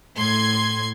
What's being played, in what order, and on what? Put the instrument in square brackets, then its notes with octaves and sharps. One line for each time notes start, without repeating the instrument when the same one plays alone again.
[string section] A2 C6 G#6